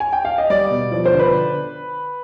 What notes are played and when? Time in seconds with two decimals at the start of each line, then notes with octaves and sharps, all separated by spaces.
0.00 G#5
0.13 G5
0.25 F5
0.38 D#5
0.50 G3 D5
0.71 B2
0.92 F3 D5
1.06 C5
1.13 D3
1.20 B4